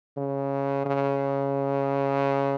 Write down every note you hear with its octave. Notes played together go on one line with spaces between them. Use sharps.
C#3
C#3